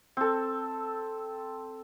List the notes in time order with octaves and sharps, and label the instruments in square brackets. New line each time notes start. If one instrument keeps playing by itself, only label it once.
[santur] C4 A4